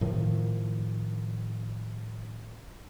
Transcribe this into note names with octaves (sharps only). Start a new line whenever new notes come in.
A2 D#3 F3